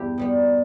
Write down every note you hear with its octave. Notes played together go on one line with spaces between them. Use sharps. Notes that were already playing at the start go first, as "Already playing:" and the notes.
Already playing: E2 G2 E4 G4
B2 G3 B3